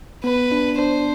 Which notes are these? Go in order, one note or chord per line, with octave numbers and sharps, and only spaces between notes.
B3 B4
D4
D4 C5